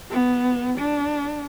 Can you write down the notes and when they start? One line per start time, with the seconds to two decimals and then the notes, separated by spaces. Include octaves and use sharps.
0.11 B3
0.78 D4